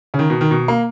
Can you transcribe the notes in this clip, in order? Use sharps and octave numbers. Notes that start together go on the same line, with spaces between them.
C#3
D#3
B2
D#3
B2
A#3